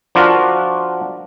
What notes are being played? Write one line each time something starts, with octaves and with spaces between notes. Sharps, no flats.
F3 D4 F4 F#4 A#4